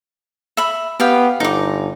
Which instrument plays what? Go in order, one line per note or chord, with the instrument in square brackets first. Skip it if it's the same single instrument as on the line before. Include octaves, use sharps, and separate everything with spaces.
[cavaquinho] E5 B5
[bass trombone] B3 [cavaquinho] G4 F5 G5
[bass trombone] G1 [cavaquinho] D#4 D6